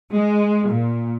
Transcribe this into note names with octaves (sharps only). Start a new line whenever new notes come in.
G#3
A#2